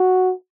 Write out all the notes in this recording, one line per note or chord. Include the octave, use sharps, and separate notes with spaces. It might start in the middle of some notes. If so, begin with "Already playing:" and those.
Already playing: F#4